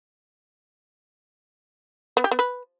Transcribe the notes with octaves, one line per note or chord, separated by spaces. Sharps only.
B3
G4
B3
B4